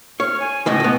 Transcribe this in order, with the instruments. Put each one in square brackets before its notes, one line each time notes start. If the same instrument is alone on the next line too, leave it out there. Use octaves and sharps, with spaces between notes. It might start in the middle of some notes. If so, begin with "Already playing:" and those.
[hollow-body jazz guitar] C#5 [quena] F6
[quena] G#5
[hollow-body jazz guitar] C#2 A2 E3 [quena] D#5
[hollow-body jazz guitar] B1 B3